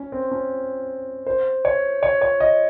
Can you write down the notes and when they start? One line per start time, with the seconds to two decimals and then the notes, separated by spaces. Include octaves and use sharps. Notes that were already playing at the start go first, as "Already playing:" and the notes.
Already playing: C#4
0.12 C4
0.31 C#4
1.26 C5
1.65 C#5
2.03 C#5
2.22 C#5
2.40 D#5